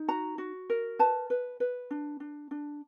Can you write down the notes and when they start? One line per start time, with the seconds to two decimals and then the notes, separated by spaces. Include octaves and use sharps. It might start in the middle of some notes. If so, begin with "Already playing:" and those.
Already playing: D#4
0.08 F#4 A#5
0.38 F#4
0.70 A#4
0.99 B4 A5
1.30 B4
1.60 B4
1.91 D4
2.20 D4
2.51 D4